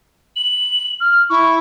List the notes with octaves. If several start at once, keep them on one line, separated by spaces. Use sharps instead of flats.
F#7
F6
E4 C#6